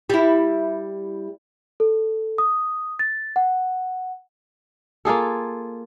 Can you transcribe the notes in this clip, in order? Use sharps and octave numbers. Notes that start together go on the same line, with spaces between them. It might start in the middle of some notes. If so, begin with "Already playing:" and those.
G3 E4
A4
D#6
A6
F#5
A#3 F4 G#4 A4